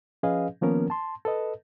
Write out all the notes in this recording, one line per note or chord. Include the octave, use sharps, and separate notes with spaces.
F3 C#4 G#4 B4 D#5 F5
D#3 F3 A#3 B3 C#4 A#4
A5 C6
A4 B4 D#5